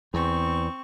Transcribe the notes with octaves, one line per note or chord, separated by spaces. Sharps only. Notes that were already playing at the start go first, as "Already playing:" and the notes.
E2 C4 C#6